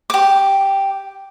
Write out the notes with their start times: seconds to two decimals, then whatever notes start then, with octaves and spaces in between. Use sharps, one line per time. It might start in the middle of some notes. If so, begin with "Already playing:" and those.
0.10 G4 D6